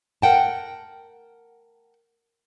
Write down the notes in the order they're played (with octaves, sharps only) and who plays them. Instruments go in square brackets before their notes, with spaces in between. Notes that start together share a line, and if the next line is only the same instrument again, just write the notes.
[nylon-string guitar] A#4 F#5 G5 A5